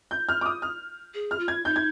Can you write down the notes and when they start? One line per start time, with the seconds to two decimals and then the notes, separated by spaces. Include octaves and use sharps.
0.11 G6
0.29 F6
0.41 D6
0.46 D#6
0.62 F6
1.14 G#4
1.31 F6
1.39 F4
1.48 G#6
1.65 D#4 G6
1.76 G#6